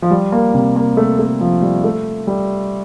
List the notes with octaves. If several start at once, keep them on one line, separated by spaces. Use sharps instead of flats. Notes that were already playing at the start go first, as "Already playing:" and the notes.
F3
G3
A#3
C3
A#3
A3
A3
F3
G3
A3
G3